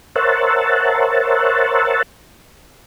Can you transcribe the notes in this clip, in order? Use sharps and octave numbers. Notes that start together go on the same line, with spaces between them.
A#4 C5 C#5 E5 F#5 A5